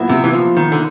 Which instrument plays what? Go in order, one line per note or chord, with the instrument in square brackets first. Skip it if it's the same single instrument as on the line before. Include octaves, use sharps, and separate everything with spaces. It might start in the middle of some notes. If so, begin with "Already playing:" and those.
Already playing: [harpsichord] A#2 F#3 B3 E4
[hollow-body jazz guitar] C3
E3
F3
D#3
D3